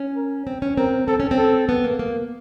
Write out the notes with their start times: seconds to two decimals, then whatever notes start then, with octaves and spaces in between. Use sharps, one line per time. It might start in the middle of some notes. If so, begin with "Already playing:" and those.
Already playing: C#4
0.16 A#4
0.47 C4
0.62 C#4
0.77 C4 A#4
1.08 C4 A4
1.20 C#4
1.31 C4
1.38 A4
1.69 B3
1.84 A#3
1.99 A#3